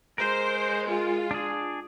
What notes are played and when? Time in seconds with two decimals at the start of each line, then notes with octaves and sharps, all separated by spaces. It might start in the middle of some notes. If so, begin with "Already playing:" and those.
0.18 G#3 A#4 C5
0.87 F4
1.31 D4 G#4